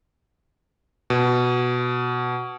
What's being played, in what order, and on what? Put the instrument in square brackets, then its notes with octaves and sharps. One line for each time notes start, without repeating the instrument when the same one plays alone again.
[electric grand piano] B2